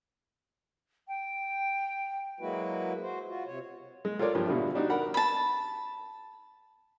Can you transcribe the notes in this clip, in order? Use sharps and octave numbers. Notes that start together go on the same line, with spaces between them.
G5
F#3 G#3 A#3 E4 F#4 B4
F#4 C5
F4 F#4
C3 C#5
G#3
F4 A4 A#4 C#5 D5
G2 F3
A#1 B2 D3 G3 E4
G3 D4 D#4 F#4
A#4 D5 F#5 B5
A5 B5